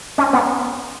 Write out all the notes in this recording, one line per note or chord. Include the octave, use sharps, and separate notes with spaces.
C#4
B3